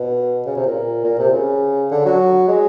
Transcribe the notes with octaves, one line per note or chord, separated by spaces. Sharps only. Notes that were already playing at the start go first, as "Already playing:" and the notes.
Already playing: B2
C#3
C3
A#2
A#2
C3
C#3
D3
F#3
G#3